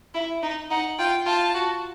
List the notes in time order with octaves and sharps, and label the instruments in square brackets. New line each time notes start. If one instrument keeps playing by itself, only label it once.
[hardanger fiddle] E4
D#4
[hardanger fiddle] D#4 [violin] F#5
[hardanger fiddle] F4 [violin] G5
[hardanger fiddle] F4 [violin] A5
[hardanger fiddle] F#4